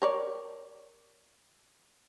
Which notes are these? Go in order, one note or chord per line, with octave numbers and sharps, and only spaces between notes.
A#4 C#5 D5